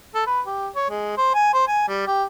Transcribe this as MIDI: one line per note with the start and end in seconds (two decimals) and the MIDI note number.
0.14 0.24 69
0.27 0.41 71
0.46 0.68 67
0.76 0.89 73
0.90 1.15 56
1.17 1.34 72
1.34 1.53 80
1.53 1.67 72
1.68 1.88 80
1.88 2.04 55
2.07 2.24 67